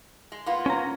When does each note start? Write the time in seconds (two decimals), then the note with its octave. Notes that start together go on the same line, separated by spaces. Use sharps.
0.32 G#3
0.46 A#3 B3 F4
0.66 C#4 A#5